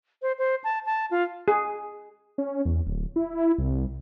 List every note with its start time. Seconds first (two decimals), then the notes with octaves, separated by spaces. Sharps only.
0.22 C5
0.38 C5
0.64 A5
0.86 A5
1.11 F4
1.48 G#4
2.38 C#4
2.66 E2
2.87 D1
3.16 E4
3.58 C2